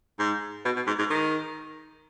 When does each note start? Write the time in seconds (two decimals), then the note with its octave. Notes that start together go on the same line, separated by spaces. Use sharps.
0.19 G#2
0.65 B2
0.76 B2
0.87 G#2
0.99 G#2
1.10 D#3